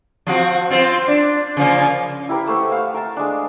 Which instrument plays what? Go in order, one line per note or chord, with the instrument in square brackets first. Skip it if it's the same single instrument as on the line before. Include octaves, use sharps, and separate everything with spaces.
[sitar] F3 C4 F#4
C4 F4 C5
D4
C#3 F3 A#3
[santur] E4 G4 A#4 B4
A3 C5 F#5
F5 E6
A#4 A5
G#3 D4